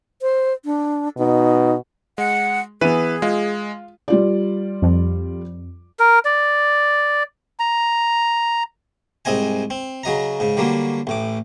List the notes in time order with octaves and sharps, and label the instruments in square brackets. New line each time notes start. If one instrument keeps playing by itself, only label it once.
[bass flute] C5
D4
[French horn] B2 [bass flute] D#4
[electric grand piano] G#3 [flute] F#5
[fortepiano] E3 B3 [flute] G#4 [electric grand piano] B4 D#7
[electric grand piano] G#3 [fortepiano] F4
[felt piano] G3 F4 D5
[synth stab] F2
[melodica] A#4
D5
A#5
[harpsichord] C2 G#2 C4 D#5 G#5
C4
C#3 F#3 D#5 A#5
G#2 C#3
D3 F#3 G3 A#3
A1 A2 D6